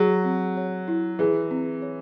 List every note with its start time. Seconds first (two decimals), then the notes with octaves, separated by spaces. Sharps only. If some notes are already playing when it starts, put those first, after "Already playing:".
Already playing: F#3 G#4
0.25 C4
0.57 C#5
0.88 E4
1.19 E3 G#4
1.51 C4
1.82 C#5